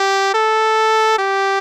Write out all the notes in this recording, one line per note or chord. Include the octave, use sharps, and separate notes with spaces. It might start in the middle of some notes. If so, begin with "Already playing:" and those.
Already playing: G4
A4
G4